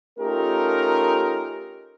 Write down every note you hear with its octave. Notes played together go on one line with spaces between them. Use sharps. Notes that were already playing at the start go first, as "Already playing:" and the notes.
A3 C#4 D#4 F4 G4 A#4